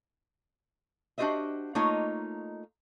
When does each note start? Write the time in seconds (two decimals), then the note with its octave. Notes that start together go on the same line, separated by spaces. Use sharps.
1.18 D4 F#4 G4 C5 D#5 E5
1.75 A3 A#3 D#4 F4 C#5 D#5